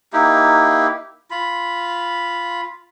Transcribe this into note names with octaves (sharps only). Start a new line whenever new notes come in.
A#3 D#4 E4 G4
F4 B5